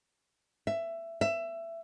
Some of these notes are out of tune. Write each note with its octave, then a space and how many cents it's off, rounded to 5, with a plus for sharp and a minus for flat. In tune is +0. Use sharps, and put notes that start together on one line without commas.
E5 +15
E5 +20